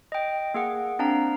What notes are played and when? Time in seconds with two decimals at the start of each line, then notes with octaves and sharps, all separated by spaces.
0.12 D#5 G5
0.54 A#3 G#4 F#5
0.99 C4 D4 F5 A#5